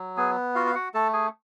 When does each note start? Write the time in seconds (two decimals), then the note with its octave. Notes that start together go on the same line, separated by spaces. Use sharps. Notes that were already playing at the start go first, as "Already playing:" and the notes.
Already playing: F#3
0.17 B3 G#4 G#5
0.55 F4 F#4 F5
0.66 F5
0.75 F#4 F#5
0.94 A3 A4 A5
1.13 G#4 G#5